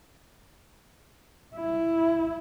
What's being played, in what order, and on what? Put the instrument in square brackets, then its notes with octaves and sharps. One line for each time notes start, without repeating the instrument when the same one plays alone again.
[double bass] E4